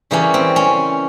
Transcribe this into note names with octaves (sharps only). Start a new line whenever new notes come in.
C#3 E3 G3 A#3 C#4
C4
C#4